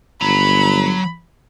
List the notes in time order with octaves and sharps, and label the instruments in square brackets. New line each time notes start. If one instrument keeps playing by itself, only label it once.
[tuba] G1 [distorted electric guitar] F#3 A#5 [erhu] B5